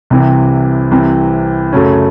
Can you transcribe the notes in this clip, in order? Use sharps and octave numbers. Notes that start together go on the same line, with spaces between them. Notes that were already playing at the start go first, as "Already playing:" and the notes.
C2 C3 E3 C4
C2 C3 E3 C4
F#2 C#3 F#3 A3 C#4